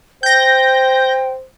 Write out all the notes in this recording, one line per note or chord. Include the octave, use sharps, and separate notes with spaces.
C5 G5 G6 A#6